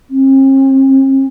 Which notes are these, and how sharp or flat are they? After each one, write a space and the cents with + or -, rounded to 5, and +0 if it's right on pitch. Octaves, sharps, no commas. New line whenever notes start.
C4 +45